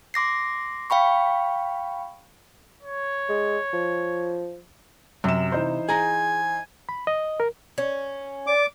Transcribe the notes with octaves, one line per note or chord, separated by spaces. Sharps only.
C6 D6 A#6 C7
F5 G5 B5 C#6
C#5
G#3
F3
F#2 C3 E7
E3 D#4 C5
G#4 G#5 A#5
B5
D#5
A#4
C#4
D5 D6